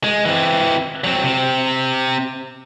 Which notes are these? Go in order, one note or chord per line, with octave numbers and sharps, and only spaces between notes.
G#3
E3 C4
F#3 C4
C3 C4